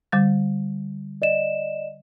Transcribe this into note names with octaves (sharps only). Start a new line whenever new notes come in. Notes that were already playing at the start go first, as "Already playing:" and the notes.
D3 G3 A6
D5 D#5 E7